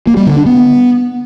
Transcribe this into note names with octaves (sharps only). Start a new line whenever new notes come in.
A#3
G3
D3
D4
B3